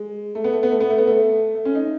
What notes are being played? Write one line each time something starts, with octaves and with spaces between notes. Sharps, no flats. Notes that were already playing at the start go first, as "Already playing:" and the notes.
Already playing: G#3
A3
B3
A3
B3
A3
B3
A3
B3
A3
A3
C#4
D#4